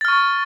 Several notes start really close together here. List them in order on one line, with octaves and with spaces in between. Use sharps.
A6 F6 C#6